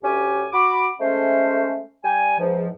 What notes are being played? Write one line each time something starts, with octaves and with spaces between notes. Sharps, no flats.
D2 C#4 G4 G#5
F#4 B5 D6
G#3 A3 C#4 C5
G3 G5 G#5
E2 G#2 F3